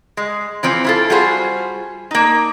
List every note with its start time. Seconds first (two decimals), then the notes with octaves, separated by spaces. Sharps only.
0.17 G#3
0.63 E3 F3 C4
0.84 E4 F4 A4
1.10 G3 F4 F#4 G#4 C5
2.11 A#3 D#4